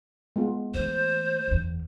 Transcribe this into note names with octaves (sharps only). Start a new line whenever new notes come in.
G#3 B3 F4
E3 A3 C5
F#1 E2